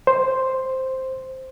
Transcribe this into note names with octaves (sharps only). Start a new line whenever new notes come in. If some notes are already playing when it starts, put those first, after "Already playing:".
C5